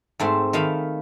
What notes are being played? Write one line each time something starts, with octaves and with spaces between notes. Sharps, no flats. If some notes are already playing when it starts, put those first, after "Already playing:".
G#2 A3 C4
D#3 A3 F5 B5